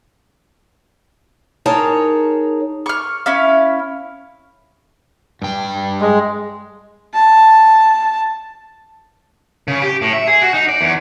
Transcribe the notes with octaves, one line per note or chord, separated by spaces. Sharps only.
D#4 G#4 A#4 C#5 A5
C#6 F6
C#4 E4 F5
G2 G5
G#3
A5
C#3
G4
A2
E5
G#4
F#4
D#4
D5
E2